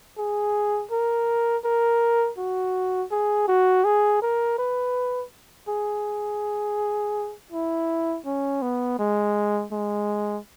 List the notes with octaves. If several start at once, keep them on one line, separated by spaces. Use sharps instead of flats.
G#4
A#4
A#4
F#4
G#4
F#4
G#4
A#4
B4
G#4
E4
C#4
B3
G#3
G#3